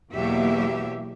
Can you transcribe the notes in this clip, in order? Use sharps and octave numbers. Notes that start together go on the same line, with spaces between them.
E2 B2 F#3 A#3 G4 E5